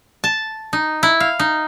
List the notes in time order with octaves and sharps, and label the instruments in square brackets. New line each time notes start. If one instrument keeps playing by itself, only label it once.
[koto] A5
D#4
E4
F5
D#4